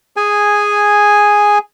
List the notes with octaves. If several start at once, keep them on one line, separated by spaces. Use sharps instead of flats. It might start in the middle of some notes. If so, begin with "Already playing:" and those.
G#4 G#5